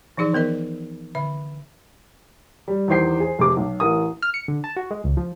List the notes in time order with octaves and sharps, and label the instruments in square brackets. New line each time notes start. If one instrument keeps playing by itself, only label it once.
[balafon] E3 F3 D#4 G#4 D5
D#3 B3 A#4 D#5
D3 E5
[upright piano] G3
E2 D#3 G4 C5 G5 C7
G#4 C5
F1 C3 G#3 D6
B1
A1 A#4 D#6
[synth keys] F6
C#7
D3
A5
F#4
G#3
C#2
F3